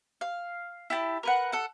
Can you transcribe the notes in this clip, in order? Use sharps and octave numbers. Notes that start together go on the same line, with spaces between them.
F5
E4 G4 A5
A#4 B4 F#5
A4 F#5